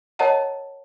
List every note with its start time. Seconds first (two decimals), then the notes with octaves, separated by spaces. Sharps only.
0.19 A#4 C#5 D#5 F#5 A5 A#5